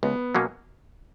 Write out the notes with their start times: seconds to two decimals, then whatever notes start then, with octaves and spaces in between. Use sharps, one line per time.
0.03 C#2 B3
0.35 B2 F#3 A#3 C#4